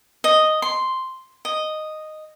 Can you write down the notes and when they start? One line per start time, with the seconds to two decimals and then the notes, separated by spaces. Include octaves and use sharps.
0.24 D#5
0.62 C6
1.45 D#5